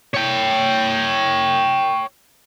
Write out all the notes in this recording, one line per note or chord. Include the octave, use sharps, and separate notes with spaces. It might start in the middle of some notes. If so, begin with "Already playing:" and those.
C#5 G5